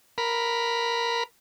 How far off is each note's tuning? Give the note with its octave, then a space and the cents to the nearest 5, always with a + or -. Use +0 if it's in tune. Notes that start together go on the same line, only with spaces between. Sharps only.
A#4 +0 B5 +0